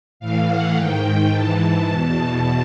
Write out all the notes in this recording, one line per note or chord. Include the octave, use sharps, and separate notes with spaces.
A2 E3 F5
F#5
G#2 D#3 G5
G#2 E3 A5
E2 B2